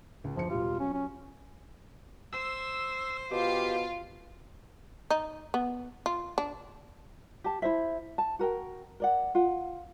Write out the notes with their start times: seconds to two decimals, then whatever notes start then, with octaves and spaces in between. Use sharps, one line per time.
0.24 C#2
0.36 G1 E2 F3 C#7
0.50 E1 G3 F4 G4
0.79 F#3 C#4
0.93 C#4
2.33 C5 E6
3.31 B2 F4 G4 F5
5.10 D#4
5.54 B3
6.06 F4
6.38 D4
7.44 G4 A5
7.62 E4 C5 E5
8.18 A5
8.39 F#4 A#4 G5
9.00 A#4 D5 F#5
9.35 F4 F#5